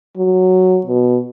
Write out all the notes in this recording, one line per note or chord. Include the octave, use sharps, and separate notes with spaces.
F#3
B2